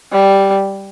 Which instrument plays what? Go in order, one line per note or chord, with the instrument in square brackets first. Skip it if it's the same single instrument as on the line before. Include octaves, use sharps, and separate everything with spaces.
[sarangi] G3